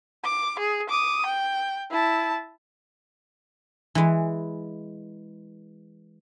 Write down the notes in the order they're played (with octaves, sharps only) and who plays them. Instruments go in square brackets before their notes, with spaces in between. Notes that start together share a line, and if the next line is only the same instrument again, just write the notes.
[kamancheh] D6
G#4
D6 D#6
G5
E4 A5
[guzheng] E3 G#3